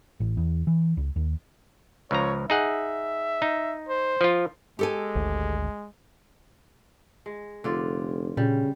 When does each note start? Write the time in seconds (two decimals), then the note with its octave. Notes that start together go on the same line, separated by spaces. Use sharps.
0.20 A1
0.37 E2
0.67 E3
0.97 C#2
1.16 D#2
2.11 C#2 F3 C#5 A#5
2.50 D#4 G#4 E5 F#5
3.42 D#4
3.89 C5
4.21 F3 F4
4.79 G#3 G4 A4 G#5
5.15 G#1 D2
7.26 G#3
7.64 F1 D3 F4 D5
8.37 A#2 C#3 G3